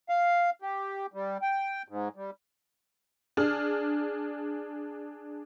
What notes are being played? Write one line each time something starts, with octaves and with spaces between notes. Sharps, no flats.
F5
G4
G3
G5
G#2
G3
D4 G#4 F6